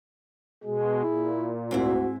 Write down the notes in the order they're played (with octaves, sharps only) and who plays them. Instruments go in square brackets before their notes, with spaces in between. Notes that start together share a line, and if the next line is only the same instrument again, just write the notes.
[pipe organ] B2 G#3 [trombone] G#4
[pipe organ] A#2 [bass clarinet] E4
[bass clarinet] D2 [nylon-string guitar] G#2 C4 E4 [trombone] F#4